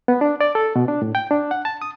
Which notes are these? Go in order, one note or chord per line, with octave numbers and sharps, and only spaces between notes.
B3
D4
D5
A4
B2
D4
A2
G5
D4
F#5
A5
D#6